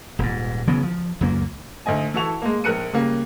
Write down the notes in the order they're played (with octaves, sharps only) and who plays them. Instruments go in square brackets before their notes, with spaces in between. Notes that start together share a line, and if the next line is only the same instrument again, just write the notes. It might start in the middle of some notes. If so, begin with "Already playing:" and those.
[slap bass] D#1 G#2
C#3 E3 F#3 B3
F3
C#2 F#2 A#3
[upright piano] D2 D#4 D#5 G#5
E3 E4 F#4 A4 C#6 F7
G#3 A#3
A#1 A#4 F#6 C#7 D#7
C#3 G3 A#3